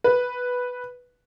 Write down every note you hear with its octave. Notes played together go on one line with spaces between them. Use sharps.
B4